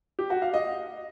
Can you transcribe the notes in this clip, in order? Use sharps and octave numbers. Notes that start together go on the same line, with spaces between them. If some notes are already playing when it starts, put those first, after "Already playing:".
G4
F#4
F5
D#5